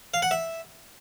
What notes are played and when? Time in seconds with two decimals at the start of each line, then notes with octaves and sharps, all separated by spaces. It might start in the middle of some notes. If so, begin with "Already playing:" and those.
0.14 F5
0.22 F#5
0.31 E5